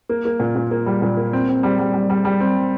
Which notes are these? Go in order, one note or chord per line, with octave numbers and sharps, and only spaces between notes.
A#3
A#3
A#2
A#2
A#3
G3
A#2
A#3
C4
C4
G3
G3
G3
G3
G3
C4